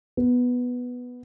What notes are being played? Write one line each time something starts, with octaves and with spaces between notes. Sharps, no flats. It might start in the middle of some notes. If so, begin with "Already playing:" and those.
B3